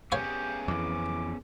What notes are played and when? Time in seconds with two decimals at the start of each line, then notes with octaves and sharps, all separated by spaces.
0.12 B3 C#4 G4 G#4 C#5 F5 B5
0.68 F2 E3 D6